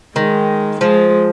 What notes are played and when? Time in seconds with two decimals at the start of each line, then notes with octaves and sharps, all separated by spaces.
0.16 D#3 G#3
0.80 F3 G#3